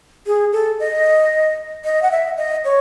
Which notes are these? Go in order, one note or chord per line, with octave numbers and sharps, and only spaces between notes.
G#4
A4
D#5
D#5
F#5
E5
D#5
C#5